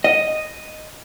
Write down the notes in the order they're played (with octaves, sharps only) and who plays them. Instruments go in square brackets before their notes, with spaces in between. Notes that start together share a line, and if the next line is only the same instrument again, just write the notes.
[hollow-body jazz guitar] D#5